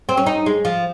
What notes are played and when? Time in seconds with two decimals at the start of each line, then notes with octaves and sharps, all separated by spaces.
0.09 C4
0.17 C#4
0.26 D#4
0.46 G#3
0.65 F3